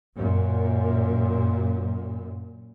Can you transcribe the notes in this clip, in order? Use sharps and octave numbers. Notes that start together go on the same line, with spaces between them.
F#2 A#2